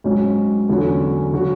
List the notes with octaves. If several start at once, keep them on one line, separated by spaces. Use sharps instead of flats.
G#2 F#3 C#4
E2 D3 F#3 C#4
C#3 F#3 C#4 F#4